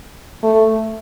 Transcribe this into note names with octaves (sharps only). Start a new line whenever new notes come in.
A3